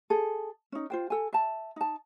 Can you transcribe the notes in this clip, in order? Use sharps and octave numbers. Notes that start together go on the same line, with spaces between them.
G#4 A4
C#4 D#4
F4 C5 G5
A4 G#5
E5 A5
D#4 A5